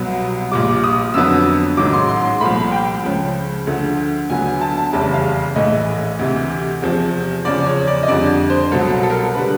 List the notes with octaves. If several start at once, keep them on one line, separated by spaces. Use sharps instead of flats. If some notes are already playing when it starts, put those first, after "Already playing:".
Already playing: C2 B2 F#3 B3
A#1 A#2 G3 D6
D#6
F2 D3 F#3 B3 E6
A1 G#2 D#3 F#3 D6
C6
C6
C6
C2 A#2 F3 A3 B5
G5
C#2 C#3 F3
D2 D3 F3 A3
D2 D3 F#3 B3 G#5
G#5
A5
A5
F1 E2 C#3 E3 G3 A5
F5
A#1 A2 E3 A3 D#5
D2 C3 E3
E2 C3 F3
E2 C#3 F3 D5
C#5
D5
D#5
F2 D3 G3 D5
C5
C2 B2 F#3 A4
A4
A#4
A4
D3 G3 B4